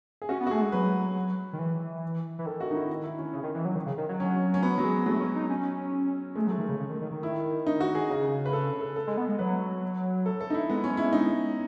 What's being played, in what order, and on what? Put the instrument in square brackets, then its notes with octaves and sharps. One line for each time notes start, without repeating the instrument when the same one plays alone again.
[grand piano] G#4
[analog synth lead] C#4 [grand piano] F#4
[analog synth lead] B3
[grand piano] F#4
[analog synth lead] A3 [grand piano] G#4
[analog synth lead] G#3
[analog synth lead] F#3 [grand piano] B4
[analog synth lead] D#3
E3
E3
[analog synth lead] D#3 [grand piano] A4
[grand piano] F#4
D#4
E4
E4
C#4
[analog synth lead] C#3
D#3
E3
F#3
D#3
C#3
D#3
F#3
[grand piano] C#4
C#4
B3
F#3
G#3
[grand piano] F#3 [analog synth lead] A3
[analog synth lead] C#4
D#4
C#4
[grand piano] G#3 [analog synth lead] A3
[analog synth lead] F#3
[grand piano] A3
[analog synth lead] D#3
C#3
C#3
D#3
D#3
D#3
[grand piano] E4
D#4
F#4
G#4
[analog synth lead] C#3
[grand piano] B4
A4
A4
A4
[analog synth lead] G#3
B3
G#3
[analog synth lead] F#3 [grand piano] B4
[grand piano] A4
A4
D#4
E4
[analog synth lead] G#3 [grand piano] B3
[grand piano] C#4
E4
D#4